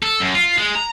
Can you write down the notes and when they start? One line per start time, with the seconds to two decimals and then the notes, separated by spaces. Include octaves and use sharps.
0.02 A4
0.20 F#2
0.35 F4
0.58 G#3
0.75 A#5